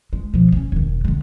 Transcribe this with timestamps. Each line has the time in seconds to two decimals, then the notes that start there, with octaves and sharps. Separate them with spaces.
0.13 G#3
0.34 B2 F3
0.52 B3 C#4
0.72 E1 D#3
1.05 D3 G#3